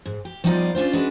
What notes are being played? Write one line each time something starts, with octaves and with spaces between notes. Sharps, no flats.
G#2
G4
F3 G3 B3 D#4 F4 D5
C#4 D4 F4 C5
G#3 C#4 D4 F#4 G#4 B4